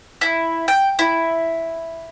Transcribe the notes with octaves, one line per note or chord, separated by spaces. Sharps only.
E4
G5
E4